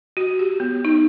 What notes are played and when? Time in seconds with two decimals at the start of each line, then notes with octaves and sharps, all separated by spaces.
0.17 F#4
0.39 G4
0.60 B3
0.85 D#4